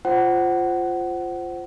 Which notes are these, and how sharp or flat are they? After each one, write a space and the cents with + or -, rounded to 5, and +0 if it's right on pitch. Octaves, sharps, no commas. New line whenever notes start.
F4 -5 C5 +0 F#5 +20